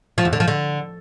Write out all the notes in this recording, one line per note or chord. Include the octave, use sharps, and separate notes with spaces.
F3
E2
D3
F3
D3